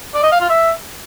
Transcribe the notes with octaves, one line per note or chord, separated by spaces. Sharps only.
D5
D#5
F5
F4
E5